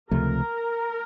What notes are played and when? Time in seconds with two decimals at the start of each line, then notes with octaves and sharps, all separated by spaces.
0.11 C#2 C3 F3 A3 A#4